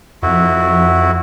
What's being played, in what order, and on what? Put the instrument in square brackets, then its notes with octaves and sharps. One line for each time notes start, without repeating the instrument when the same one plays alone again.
[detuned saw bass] F2 [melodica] E4 F#4